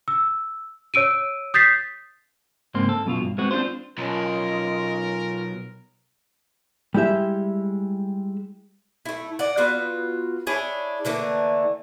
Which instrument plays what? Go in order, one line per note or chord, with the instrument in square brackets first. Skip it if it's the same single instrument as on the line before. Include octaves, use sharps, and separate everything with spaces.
[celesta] E6
C#5 E6 D7 D#7
D#6 G6 A6 B6 C7
[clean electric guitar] C#2 G#2 A#3 C4 C6
A4
F#2 B2 F4
G2
G#3 B3 C4 F#4
C4 D4 F4 C5
[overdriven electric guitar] B1 [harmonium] C#4 F4 [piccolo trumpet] A#4 [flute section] C#5 D#5 C6
[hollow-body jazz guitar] G3 G#3 E4 G4 E5
[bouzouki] A3 E4
D5 D#5 F#5
B3 F4 F#4
D4 E4 G#4 C#5
D3 E3 A3 A#3